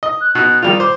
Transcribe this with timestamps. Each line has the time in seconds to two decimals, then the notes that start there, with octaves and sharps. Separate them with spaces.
0.03 D#5
0.21 F#6
0.35 B2 D#4 F#6
0.62 D#3 G3 F4 F7
0.80 C5 D6